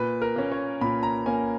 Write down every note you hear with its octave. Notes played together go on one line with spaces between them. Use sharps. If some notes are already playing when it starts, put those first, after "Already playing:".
Already playing: A#2 B4
A#4
A#3 C#4
C#5
A#2 B5
A#5
A#3 C#4 G#5